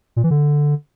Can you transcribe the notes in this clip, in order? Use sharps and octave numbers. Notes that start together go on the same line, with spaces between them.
A#2
E3
D3